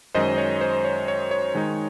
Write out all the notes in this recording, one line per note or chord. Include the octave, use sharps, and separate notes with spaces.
F#2 D#3 G#3 C5 D#5
C#5
C5
C#5
C#5
C#5
D#3 G#3 D#4